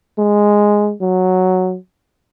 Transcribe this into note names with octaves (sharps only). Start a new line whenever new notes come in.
G#3
F#3